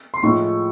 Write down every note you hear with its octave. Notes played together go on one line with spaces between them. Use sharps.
C6
A2 F3 G#3 C#6